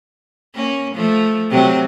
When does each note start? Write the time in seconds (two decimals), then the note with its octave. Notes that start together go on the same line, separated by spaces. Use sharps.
0.55 A#3 C#4
0.95 F3 A3
1.50 C3 F#3 C4